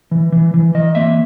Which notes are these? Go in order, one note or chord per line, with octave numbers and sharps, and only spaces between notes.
E3
E3
E3
E3 D#5
A#3 E5